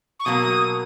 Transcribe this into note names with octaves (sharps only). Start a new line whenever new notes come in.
C#6
B2 F#3 A#3 D#6